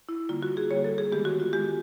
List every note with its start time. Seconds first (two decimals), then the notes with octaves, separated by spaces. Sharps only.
0.09 E4
0.29 D3 G3 A#3 F4
0.43 F#4
0.57 G#4
0.70 D3 G3 A#3 C#5
0.84 A4
0.98 G#4
1.12 D#3 G#3 B3 G4
1.25 F#4
1.40 F4
1.53 D#3 G#3 B3 G4